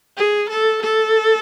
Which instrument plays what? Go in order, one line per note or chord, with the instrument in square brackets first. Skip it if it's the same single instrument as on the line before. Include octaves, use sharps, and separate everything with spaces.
[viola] G#4
A4
A4